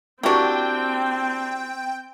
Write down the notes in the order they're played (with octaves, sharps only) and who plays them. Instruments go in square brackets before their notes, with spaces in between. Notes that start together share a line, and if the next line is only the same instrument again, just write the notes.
[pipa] A#3 D4 [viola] C4 [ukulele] E4 F#4 G4 [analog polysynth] G5